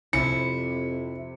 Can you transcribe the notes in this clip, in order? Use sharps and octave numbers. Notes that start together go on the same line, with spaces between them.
F2 C3 E4 C#7